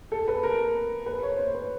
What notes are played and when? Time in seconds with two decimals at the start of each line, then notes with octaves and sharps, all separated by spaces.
0.12 A4
0.28 B4
0.43 A#4
1.06 B4
1.23 C#5
1.37 C5
1.54 B4